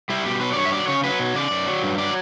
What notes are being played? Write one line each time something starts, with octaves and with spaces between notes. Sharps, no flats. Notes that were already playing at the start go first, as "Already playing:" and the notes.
G3 E4
B2 G4
F#3 B4
D5
G2 C#5
E5
F#3 D5
C#3 C#5
F#3 B4
B2
C#3 D5
F#2
F#3
G2
F#3 D5